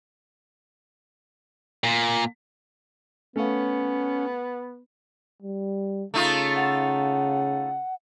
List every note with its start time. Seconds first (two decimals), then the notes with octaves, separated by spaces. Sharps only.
1.84 A#2
3.36 A3 B3 C#4 F5
5.42 G3
6.14 C#3 A3 D#4 F4
6.56 F#5